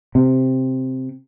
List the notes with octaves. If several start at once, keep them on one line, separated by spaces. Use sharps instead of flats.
C3